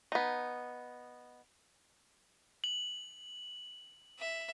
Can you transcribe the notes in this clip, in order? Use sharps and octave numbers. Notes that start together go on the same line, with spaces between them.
B3 D#4
F#7
E5